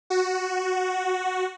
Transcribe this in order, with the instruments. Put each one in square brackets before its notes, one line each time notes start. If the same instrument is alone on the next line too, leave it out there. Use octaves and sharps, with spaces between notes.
[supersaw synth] F#4